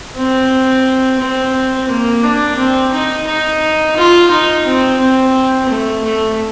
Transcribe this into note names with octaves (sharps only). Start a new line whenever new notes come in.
C4
C4
A#3
D4
C4
D#4
D#4
F4
D#4
C4
C4
A3
A3